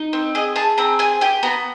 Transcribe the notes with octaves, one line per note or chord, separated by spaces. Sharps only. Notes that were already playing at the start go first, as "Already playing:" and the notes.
Already playing: D#4
C4
G#4 D#5
G#4 A5
C4 A#5
G#4 G#5
G4 G#5
B3 A#5